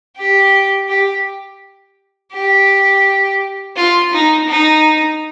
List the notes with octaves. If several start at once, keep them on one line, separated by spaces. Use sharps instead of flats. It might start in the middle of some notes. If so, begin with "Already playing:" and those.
G4
G4
G4
F4
D#4
D#4